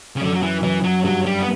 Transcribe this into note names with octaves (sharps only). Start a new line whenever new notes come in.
C#3
F#2 D3
F#3
E3
F#2 E3
F#3
G2 F#3
G3
B3